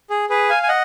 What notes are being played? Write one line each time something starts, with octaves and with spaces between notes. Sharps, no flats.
G#4
G#4 B4
F5 G#5
G#5
D#5 F#5